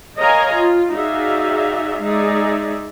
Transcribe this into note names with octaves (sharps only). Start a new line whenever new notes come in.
A#4 C#5 D#5 F5 G#5 A#5
F4
D#4 F#4 G#4 D5 E5 F5
G#3 D#4 G#4 D5 E5